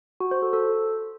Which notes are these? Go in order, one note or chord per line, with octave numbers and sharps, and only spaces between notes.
F#4
C5
A4
A4